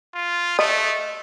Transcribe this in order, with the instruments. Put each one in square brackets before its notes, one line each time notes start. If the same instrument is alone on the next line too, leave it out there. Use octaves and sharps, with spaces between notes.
[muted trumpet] F4
[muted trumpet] A3 [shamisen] D#5